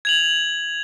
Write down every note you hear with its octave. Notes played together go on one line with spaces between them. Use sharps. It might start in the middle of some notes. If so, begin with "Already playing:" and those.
G#6 F7 F#7